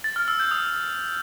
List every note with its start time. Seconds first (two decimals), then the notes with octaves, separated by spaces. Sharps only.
0.04 A6
0.16 F6
0.28 E6
0.40 G6
0.51 D#6